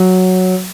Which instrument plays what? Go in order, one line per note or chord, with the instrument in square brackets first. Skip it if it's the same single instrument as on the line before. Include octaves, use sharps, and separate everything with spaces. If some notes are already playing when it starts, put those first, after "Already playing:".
Already playing: [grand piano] F#3